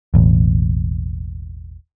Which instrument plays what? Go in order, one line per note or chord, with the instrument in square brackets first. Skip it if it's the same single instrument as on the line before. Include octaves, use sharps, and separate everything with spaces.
[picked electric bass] E1 A1